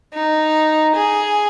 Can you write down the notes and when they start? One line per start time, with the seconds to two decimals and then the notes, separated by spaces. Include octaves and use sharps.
0.13 D#4
0.95 G#4